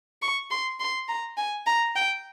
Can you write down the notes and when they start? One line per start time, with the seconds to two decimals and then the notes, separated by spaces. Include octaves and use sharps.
0.22 C#6
0.51 C6
0.80 C6
1.08 A#5
1.37 G#5
1.66 A#5
1.96 G5